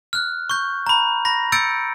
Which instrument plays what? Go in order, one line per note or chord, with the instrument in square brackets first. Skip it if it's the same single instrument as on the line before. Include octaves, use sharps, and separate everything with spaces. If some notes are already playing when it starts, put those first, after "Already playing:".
[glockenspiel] F6 F#6
C#6 G6
A#5 B5
B5 A#6
E6 G6 A6 C#7 D7